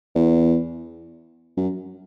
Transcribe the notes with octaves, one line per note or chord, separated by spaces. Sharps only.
E2
F#2